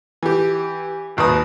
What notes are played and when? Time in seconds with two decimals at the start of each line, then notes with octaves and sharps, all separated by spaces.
0.23 E3 G4
1.17 G#1 D#2 B4 D#6